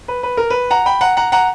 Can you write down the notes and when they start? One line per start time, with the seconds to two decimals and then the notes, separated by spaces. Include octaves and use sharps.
0.08 B4
0.23 B4
0.37 A#4
0.50 B4
0.70 F#5 A#5
0.86 G5 B5
1.01 F#5 A#5
1.17 F#5 A#5
1.32 F#5 A#5